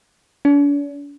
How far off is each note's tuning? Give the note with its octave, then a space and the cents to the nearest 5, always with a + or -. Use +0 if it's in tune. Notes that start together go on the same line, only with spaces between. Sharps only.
D4 -45